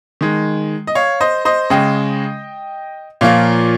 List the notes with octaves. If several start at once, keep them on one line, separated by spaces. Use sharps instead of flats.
D#3 G#3
D#5
C#5 F5
C5 D#5
C5 D#5
C#3 G#3 D#5 G5
A#2 F3 A#3 C#5 F5